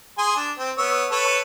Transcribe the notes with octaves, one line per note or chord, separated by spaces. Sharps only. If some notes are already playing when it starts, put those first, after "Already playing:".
G#4 G#5 C6
D4
C4
B3 C#5 E6
A4 B4 C#5